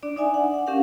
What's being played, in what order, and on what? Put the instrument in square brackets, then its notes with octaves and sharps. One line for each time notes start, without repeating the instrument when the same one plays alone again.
[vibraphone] D4 D5
D4 D#4 D5 E5 G#5
F#5
F#5
C#4 D4 G4 A#4 F5 F#5